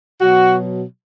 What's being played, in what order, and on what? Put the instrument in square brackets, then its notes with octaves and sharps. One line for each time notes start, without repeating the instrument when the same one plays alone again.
[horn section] B2 F#3 F#4